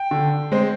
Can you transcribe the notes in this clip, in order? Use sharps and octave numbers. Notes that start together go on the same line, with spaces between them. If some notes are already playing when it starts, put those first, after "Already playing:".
Already playing: G5
D3
G#3 C4